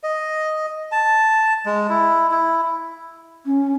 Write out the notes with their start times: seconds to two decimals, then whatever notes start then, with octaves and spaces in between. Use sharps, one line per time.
0.03 D#5
0.92 A5
1.66 G#3
1.89 E4
2.31 E4
3.45 C#4